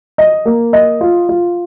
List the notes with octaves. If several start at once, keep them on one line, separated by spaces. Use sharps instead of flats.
D#5
A#3
D#5
F4
F4